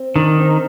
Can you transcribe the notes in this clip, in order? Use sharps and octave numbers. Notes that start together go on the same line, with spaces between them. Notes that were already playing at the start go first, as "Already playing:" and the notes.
Already playing: C4
D#3 D4
C4 D#4